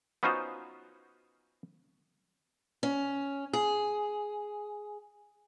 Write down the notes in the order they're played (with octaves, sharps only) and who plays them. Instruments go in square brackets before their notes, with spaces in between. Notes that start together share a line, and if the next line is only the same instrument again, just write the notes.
[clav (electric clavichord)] B3 C#4 D#4 F4 F#4 C5
[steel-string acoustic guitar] C#4
G#4